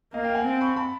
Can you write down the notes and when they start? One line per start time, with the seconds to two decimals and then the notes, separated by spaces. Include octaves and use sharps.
0.13 A#3 D#5 F5
0.24 F5 G5
0.34 F#5 G#5
0.45 C4
0.61 B5 C#6
0.76 A5 B5